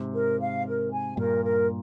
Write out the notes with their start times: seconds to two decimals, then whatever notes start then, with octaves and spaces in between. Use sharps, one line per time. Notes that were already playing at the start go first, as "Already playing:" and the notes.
Already playing: G#2 C3
0.13 A#4
0.39 F5
0.65 A#4
0.91 G#5
1.17 G2 A#2 A#4
1.44 A#4